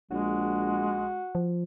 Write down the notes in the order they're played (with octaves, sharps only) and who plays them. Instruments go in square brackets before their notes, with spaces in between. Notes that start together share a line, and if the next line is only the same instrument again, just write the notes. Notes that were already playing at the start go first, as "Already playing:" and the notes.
[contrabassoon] A#1 [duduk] G#3 [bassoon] F#4
[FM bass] F3